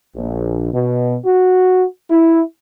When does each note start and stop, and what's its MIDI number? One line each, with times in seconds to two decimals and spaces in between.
0.16 0.72 34
0.73 1.17 47
1.26 1.84 66
2.10 2.41 64